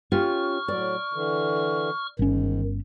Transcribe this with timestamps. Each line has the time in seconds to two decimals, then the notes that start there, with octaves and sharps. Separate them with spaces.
0.12 C#4 F4 G4 C#6 F6
0.68 A2 F#3 D5
1.13 D3 E3
2.19 G1 G#2 D#3 C#4